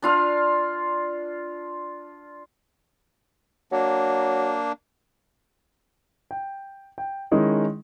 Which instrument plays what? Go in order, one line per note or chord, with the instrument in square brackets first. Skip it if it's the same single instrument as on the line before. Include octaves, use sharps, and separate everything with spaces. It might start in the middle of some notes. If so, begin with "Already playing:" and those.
[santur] D4 F4 F5
[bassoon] F#3 [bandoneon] A#3 D4
[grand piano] G5
G5
D#3 G#3 C#4 D#4 E4